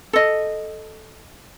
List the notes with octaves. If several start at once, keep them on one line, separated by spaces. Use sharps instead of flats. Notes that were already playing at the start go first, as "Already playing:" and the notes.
A4 D#5